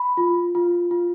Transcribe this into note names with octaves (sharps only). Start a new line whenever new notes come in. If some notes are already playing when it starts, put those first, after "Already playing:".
Already playing: B5
F4
F4
F4